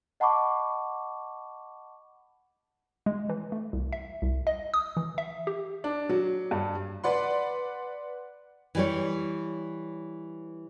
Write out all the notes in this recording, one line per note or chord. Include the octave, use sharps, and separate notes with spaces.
D#5 F#5 A5 B5 C#6 D6
G#3
E3
A3
C2
E5
C2
D#5
D#6
E3
E5
G4
D4
F#3
G2
B4 D5 F#5 C6
E3 G3 C#5